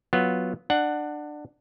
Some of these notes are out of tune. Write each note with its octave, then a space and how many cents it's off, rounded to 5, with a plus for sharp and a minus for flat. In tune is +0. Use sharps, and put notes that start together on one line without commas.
F#3 +0 B3 +0 F4 +0
D4 +20 F#5 +0